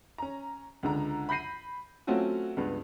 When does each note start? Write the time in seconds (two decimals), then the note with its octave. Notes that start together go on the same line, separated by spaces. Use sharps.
0.18 C#4 A#5
0.83 C#2 D3 A#5
1.29 B5 G6 A#6 C7 D#7
2.07 F#3 A3 C4 C#4 F4 F#4
2.57 C#2 G2 B3